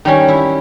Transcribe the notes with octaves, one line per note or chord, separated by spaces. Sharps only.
D#3 G3 C#4 G4
E4